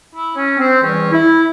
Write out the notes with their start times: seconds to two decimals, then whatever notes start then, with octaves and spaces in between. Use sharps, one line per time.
0.13 E4
0.35 C#4
0.58 C4
0.81 E2 E3 G3 C#4
1.12 E4